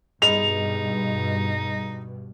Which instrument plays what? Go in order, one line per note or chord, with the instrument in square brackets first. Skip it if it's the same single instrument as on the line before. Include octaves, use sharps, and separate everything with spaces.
[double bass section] G2 B2 [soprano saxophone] D#4 [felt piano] G#4 D#5 B5 [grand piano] F7